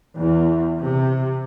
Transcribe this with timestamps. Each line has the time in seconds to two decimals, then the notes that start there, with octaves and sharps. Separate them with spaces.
0.17 E2
0.81 C3